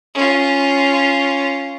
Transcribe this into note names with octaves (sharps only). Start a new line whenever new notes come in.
C#4 F4